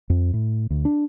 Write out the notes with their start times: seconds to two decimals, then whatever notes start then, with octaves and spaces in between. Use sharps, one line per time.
0.10 F2
0.33 A2
0.70 D2
0.85 D4